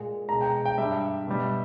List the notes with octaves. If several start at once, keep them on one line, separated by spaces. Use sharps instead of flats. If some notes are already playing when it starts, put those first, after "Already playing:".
Already playing: A#2 G#3
B2 G#3 A#5
G5
G5
G2 G3 E5
B2 G3